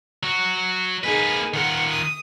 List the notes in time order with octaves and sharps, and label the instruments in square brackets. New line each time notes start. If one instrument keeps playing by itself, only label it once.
[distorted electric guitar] F#3 F#4
[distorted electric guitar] A#3 B4 [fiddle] D#4 G#4
[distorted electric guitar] D#3 F4 [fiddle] F#5
[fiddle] D#6